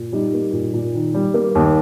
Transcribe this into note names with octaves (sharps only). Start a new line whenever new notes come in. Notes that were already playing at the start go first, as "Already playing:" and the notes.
Already playing: A#2
G3 D#4 G4
A#3
A#2
A#2
D#3
G3
A#3
D#2